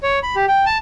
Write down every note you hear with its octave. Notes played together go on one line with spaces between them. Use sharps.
C#5
B5
G4
G5
A5